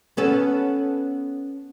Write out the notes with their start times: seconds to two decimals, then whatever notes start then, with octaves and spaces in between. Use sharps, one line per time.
0.17 B3 C#4 A4